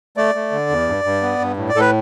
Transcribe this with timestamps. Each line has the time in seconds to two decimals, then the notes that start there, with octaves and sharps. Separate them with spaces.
0.17 A3 D5
0.35 A3
0.52 D3
0.70 E2
0.87 G2
1.04 G2
1.22 B3
1.39 G2
1.57 A2
1.69 D5
1.75 A2 A4
1.80 B4